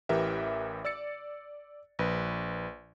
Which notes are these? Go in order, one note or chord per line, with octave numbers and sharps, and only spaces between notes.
A1 E3 G4 A#4 B4 E5
D5 E6 A6 C#7
A#1 B4